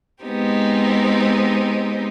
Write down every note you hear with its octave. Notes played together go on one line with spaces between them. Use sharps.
G#3 B3 C4 D#4 G4